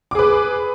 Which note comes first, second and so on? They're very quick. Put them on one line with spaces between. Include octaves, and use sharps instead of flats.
D6 G#4 B4